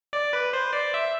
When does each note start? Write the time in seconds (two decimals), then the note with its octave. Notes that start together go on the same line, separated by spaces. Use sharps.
0.13 D5
0.33 B4
0.53 C5
0.73 D5
0.94 E5